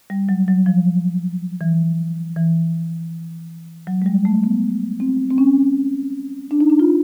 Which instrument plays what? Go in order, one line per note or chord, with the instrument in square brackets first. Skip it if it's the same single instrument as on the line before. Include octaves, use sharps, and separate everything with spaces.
[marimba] G3
F#3
F#3
F3
E3
E3
F#3
G#3
G3
A3
B3
C4
C4
C#4
D4
D#4
D4
F4